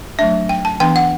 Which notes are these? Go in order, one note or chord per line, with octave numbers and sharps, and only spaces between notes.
F#3 A3 D4 E5
G5
A5
E3 B3 D4 G5
F#5